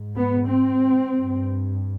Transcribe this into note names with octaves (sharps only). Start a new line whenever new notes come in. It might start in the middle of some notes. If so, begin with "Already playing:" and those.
Already playing: G#2
B3
C4
G2